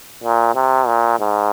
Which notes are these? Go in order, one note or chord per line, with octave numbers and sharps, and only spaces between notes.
A#2
C3
A#2
G#2